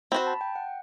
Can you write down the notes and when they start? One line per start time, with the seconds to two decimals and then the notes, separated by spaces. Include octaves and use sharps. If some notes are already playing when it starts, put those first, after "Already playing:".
0.12 C4 F#4 C5 B5
0.27 A5
0.41 G5
0.56 F#5